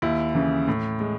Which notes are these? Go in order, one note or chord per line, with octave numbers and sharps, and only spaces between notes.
D#2 E4
C#3 E3
A2
G#3